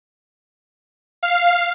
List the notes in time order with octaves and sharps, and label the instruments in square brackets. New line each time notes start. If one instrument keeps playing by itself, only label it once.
[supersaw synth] F5